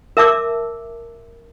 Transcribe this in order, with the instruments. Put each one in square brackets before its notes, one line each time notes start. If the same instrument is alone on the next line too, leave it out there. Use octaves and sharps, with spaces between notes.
[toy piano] A#4 E5 A5 D6 E6